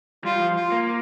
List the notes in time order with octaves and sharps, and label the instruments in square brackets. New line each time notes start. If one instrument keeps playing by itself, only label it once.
[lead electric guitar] G3 [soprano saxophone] F4
[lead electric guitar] F3
[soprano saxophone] F4
[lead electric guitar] A#3